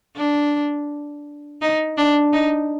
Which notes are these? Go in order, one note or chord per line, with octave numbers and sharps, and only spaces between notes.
D4
D#4
D4
D#4